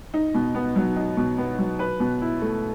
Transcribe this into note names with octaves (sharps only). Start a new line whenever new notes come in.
D#4
B2
B3
F#3
D#4
B2
B3
F#3
B4
B2
E4
A3